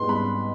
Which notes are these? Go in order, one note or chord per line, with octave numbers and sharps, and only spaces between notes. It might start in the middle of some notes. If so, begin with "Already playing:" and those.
Already playing: G#2 G3 B3 C6
B5